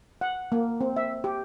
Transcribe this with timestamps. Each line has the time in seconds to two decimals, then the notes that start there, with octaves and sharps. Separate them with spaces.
0.21 F#5
0.52 A#3
0.81 C4
0.96 E5
1.24 G4